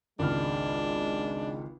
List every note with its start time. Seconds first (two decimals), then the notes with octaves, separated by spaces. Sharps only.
0.19 G#1 C#2 G#3 D4 F6